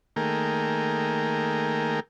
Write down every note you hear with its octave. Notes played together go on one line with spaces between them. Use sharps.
D#3 A3 A#3 G#4 A#4 G5